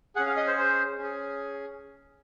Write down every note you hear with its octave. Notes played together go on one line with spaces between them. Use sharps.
C#4 G#4 F#5
F5
D#5
C5
C5
C#4
G#4